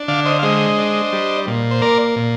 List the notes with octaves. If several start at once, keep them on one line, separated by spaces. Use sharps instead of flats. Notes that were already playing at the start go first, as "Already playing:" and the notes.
Already playing: D4
D3 D5 F5
C5 D#5
F5
G#3 C5 D#5
D4
G3
A#2
C5
A#3 A#4 D5
A#2